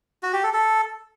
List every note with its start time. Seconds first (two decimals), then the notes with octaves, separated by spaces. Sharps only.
0.23 F#4
0.33 G4
0.43 A4
0.54 A4